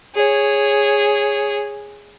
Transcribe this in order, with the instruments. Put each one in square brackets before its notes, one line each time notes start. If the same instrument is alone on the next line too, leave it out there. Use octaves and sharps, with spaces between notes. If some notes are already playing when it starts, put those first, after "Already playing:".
[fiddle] G#4 C#5